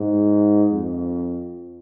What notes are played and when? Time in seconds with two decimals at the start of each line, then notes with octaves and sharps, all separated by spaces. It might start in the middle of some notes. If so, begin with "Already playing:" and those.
Already playing: G#2
0.72 F2